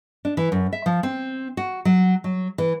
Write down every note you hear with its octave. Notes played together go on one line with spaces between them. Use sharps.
D4
E3
F#2
E5
F3
C4
F#4
F#3
F#3
E3